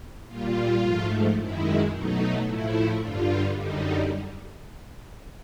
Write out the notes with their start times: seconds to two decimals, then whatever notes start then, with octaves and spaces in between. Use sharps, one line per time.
0.27 A#2 G3 F4
0.82 G#2 F3 A3
1.37 F#2 D#3 G#3 E4
1.91 B2 F#3 A3 D#4
2.46 A2 F3 A3 E4
3.01 G2 D3 G3 F4
3.56 F#2 D3 G3 D#4